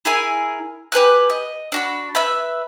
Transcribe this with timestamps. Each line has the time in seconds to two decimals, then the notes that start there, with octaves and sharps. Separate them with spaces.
0.05 E4 G#4 A#4 G#5
0.92 G4 B4 G#5 F#6
1.30 D#5
1.72 D4 F#4 B5
2.15 B4 E5 B5